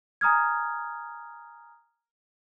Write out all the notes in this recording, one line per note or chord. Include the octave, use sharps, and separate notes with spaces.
G#5 A#5 D#6 F6 G#6